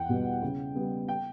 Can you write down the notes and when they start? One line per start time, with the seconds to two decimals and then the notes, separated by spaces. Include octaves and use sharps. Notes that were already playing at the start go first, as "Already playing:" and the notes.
Already playing: E2 F#5 G5
0.09 B2 G3 B3
0.42 C#3
0.75 G3 B3
1.09 G5